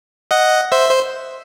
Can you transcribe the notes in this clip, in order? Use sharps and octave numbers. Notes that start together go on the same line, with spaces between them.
D#5 F#5
C5 E5
C5